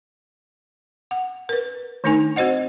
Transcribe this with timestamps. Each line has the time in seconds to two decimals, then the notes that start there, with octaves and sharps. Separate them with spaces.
1.11 F#5
1.49 A#4 B4
2.04 D#3 A3 D4 D#4 A#4 G#5
2.36 C4 F#4 C5 D#5 F#5